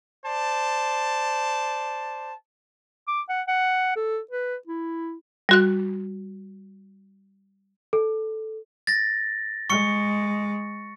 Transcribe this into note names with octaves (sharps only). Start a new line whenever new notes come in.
C5 D5 A5
D6
F#5
F#5
A4
B4
E4
G3 F#4 F#6
A4
A6 A#6
G#3 C#6 C#7